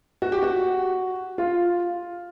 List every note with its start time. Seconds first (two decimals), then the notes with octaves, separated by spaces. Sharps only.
0.22 F#4
0.32 G4
0.43 F#4
1.38 F4